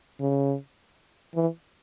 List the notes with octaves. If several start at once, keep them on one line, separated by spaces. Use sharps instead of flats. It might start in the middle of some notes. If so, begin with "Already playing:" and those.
C#3
E3